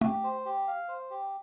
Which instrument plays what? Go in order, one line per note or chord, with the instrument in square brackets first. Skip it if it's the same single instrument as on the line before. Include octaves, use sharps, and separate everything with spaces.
[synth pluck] A3 [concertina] G4
[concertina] C5
G4
F5
C5
G4